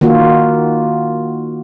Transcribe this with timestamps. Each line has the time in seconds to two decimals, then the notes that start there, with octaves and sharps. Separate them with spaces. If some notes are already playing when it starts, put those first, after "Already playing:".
0.01 D#3 A#3 F4 F#4